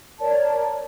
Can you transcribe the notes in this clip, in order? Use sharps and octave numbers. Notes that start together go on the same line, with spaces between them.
A#4 C#5 D5 A5